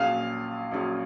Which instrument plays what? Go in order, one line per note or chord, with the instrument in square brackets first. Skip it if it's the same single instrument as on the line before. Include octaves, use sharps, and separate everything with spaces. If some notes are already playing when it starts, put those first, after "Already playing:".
Already playing: [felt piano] A#1 A#2 F#3 C#4 G#4 [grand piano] F5
[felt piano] A#1 A#2 F#3 C#4 G#4